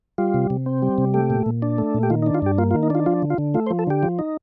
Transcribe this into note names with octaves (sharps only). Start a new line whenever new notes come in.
G3 F4
C3
C3
C4
G3
C3
A3 G4
A#2
A#2
D4
A3
A#2
G4
D#3 F4
D#4
D4
F4
G2 G4
A#3 F4
F4
D#3
D#4
D4 F4
F3 F4
D3
F4
D3
A3 F4
C5
F3
A4
D3 G4
F3
D#4